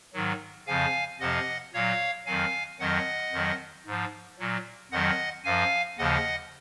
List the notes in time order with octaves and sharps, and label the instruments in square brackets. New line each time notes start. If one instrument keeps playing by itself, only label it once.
[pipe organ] G#2 D#3 F#3
F2 C#3 F3 F5 G#5
F2 C3 F3 D#5 F#5
A#2 F#3 C#5 F5
F2 D#3 F#3 F5 G#5
F2 D#3 F#3 D#5 F#5
F2 D#3 F#3
G#2 F3
A#2 F#3
F2 D#3 F#3 D#5 F#5
F#2 F3 F5 G#5
D#2 C#3 F3 D#5 F#5